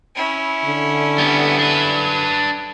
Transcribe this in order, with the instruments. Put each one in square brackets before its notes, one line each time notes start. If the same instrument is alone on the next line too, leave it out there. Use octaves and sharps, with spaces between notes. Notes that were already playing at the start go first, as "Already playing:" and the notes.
[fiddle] C#4 E4
[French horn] D3
[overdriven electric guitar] G3 B3
D4 B4